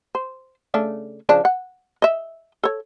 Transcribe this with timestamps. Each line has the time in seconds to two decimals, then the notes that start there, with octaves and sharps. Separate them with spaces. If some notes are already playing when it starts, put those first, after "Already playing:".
0.15 C5
0.74 C#3 A3 D4
1.29 C#3 F3 D4
1.45 F#5
2.02 D#5 E5
2.64 A4 C#5